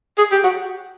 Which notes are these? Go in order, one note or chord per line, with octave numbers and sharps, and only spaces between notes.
G#4
G4
F#4